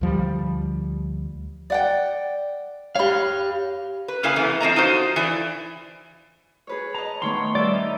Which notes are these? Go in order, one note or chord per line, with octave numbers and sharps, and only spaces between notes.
D2 F3 G3
D5 F#5 G5
G4 C#5 F5 B5
B4
C#3 A#3 E4 B4 F5 G#5
C3 E3 A3 B3
F3 C4 D#5 A#5
D#4 F4 F#4 C5
E3 A4 D5
G#4 B4 C#5
D#5 A5 A#5
D#3 A3 B3 C#5 C6
G3 D5 E5 E6
C#4 D#4